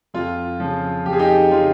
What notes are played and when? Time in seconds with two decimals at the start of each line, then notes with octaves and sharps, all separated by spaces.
0.14 F2 F4
0.60 C#3 F3
1.06 F2 G4
1.13 G#4
1.19 D#4 G4
1.51 C#3 F3 F4